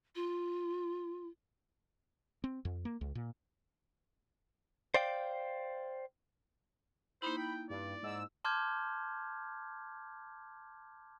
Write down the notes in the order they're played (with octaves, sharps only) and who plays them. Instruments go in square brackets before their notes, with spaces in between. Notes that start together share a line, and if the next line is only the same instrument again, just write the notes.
[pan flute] F4
[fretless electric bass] C4
F2
A#3
C#2
A#2
[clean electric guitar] C5 D5 F5 G5
[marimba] A#3 D#4 E4 [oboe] C5 [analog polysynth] B5
[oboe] G5
[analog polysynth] G2 [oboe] D5
[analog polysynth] G#2 E6
[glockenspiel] A5 C6 D6 F6 G6 G#6